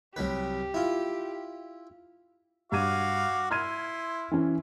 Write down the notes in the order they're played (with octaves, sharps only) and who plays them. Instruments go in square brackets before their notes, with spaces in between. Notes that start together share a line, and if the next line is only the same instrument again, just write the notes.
[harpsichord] C2 F#3 B4 [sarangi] G4
[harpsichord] E4 F4
[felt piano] G2 G#6 D#7 [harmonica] F#4 F5 D6
[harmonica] E4 C6 [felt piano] F6 G#6 D#7
[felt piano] E3 C#4